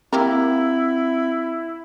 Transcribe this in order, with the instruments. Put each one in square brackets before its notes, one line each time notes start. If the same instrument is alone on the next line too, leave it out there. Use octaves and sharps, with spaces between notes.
[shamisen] A#3 G4 A#4 [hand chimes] C4 [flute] E4